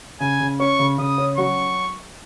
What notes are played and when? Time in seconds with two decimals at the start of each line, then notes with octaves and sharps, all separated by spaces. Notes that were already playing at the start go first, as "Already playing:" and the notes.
0.20 C#3 G#5
0.40 C#3
0.60 C#4 C#6
0.79 C#3
0.98 C#3 D#6
1.18 C#4
1.37 F#3 C#6